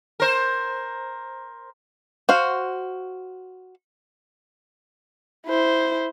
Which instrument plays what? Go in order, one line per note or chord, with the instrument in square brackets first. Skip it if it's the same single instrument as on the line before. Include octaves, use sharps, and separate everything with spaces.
[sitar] A#4 C5
[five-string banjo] F#4 C5 F5
[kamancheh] E4 C5